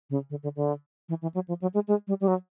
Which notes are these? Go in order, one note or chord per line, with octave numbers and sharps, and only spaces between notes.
C#3
D3
D3
D3
E3
E3
F#3
F3
F#3
G#3
G#3
G3
G3
F#3